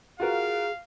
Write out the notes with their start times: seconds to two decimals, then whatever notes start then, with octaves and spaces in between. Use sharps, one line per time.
0.20 F4 F#4 G#4 A#4 F5